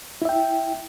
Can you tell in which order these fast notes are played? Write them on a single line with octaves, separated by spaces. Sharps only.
E4 E5 G5